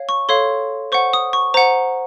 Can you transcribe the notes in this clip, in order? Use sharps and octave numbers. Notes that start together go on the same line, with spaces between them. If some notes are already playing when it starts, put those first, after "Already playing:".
Already playing: C#5 F5
C#6
A4 C#5 F5 C6
C5 F#5 C#6
D#6
C#6
C5 F#5 A#5